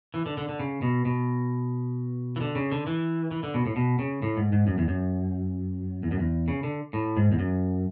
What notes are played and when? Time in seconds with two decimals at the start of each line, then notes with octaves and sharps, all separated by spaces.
0.14 E3
0.26 D3
0.37 D3
0.49 D3
0.59 C#3
0.82 B2
1.05 B2
2.36 E3
2.41 D3
2.55 C#3
2.72 D3
2.87 E3
3.31 E3
3.43 D3
3.54 B2
3.66 A2
3.76 B2
3.99 C#3
4.22 A2
4.37 G#2
4.52 G#2
4.67 F#2
4.78 E2
4.88 F#2
6.03 E2
6.11 F#2
6.19 E2
6.48 C#3
6.63 D3
6.93 A2
7.17 G#2
7.32 E2
7.39 F#2